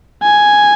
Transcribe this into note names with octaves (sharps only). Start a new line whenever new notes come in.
G#5